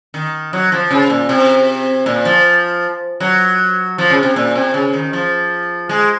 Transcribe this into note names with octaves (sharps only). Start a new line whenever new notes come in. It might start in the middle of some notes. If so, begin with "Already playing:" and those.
D#3
F#3
F3
C#3
A#2
C3
A#2
F3
F#3
F3
C#3
C3
A#2
C3
C#3
D#3
F3
G#3